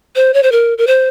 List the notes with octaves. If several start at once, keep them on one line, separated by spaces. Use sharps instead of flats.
C5
C#5
C5
A#4
A#4
C5